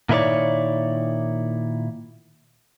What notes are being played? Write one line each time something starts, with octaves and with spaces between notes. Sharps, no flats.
A#2 D#3 E4 A#4 C#5 D5